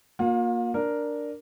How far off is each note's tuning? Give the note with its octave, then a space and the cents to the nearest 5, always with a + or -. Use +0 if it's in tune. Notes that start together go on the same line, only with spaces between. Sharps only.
A#3 +15 F4 +40
D4 +0 A#4 +0